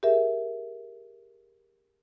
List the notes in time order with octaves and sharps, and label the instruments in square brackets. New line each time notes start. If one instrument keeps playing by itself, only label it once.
[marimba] G4 G#4 A#4 E5